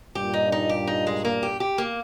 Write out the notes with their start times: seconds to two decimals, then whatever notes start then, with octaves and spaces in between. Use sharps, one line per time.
0.15 G2 A#2 G4
0.34 D#4
0.52 D#4
0.69 G4
0.87 D#4
1.07 G#3
1.25 A#3
1.43 G4
1.60 G4
1.78 A#3